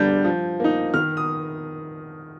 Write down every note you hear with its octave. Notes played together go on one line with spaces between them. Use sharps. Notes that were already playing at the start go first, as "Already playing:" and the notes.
Already playing: D3 G3 D4 G6
F3
A#3 D#4
D#3 F6
D#6